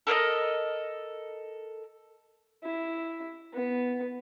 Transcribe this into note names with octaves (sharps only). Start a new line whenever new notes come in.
A4 A#4 C5 D#5
E4
B3